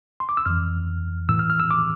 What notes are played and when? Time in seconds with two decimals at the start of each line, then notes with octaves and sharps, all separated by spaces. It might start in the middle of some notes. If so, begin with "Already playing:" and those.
0.20 C6
0.29 D6
0.37 E6
0.46 F2 E3 F6
1.29 A2 E3 E6
1.39 F6
1.50 F6
1.60 E6
1.71 D6